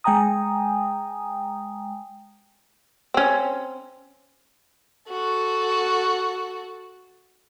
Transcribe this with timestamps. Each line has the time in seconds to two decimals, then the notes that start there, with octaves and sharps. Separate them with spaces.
0.04 G#3 G5 G#5 A#5 D#6
3.14 C4 C#4
5.10 F#4 A4